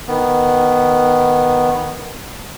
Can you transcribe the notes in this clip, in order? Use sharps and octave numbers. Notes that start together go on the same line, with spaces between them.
D#3 B3